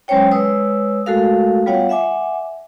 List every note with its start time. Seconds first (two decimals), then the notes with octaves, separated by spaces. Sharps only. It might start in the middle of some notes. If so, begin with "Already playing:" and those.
0.08 F#3 G#3 C#4 C5 C#5 G5
0.31 G#3 B4 C#5 D#6 E6
1.06 G#3 A3 F#4 A4 A#4 F5
1.66 G3 B3 F4 C#5 F5 F#5
1.89 E5 F#5 G#5 D6